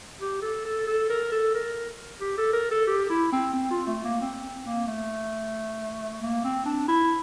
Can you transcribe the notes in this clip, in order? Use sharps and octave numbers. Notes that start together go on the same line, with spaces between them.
G4
A4
A4
A4
A#4
A4
A#4
G4
A4
A#4
A4
G4
E4
C4
C4
F4
A3
A#3
C4
C4
A#3
A3
A#3
C4
D4
E4